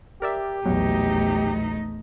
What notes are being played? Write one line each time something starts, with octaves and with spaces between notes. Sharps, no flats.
G4 A#4 D5 E5
A#1 E2 B2 F#3 A3 D#4